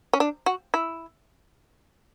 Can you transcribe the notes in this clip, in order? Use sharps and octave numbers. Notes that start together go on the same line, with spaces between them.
C#4
D4
F#4
E4